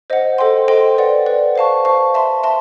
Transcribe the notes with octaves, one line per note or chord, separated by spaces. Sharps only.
C5 D#5 F#5
A4 C5 D#5 G5 C6
A4 C5 D#5 G5 C6
B4 D5 F#5
B4 D5 F#5
C5 F5 A5 C#6
C5 F5 A5 C#6
E5 A5 C6
E5 A5 C6